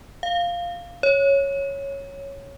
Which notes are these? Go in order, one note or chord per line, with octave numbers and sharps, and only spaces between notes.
F5
C#5